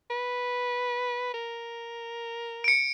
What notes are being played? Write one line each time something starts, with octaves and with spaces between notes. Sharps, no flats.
B4
A#4
C#7 D7